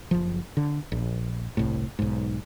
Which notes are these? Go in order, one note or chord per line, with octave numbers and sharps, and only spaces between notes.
F#1 F3
D3
A#1
G1 C2 A2
B1 G#2